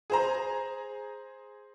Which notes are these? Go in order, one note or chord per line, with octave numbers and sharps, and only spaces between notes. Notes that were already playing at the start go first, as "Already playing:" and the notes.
G#4 C5 A#5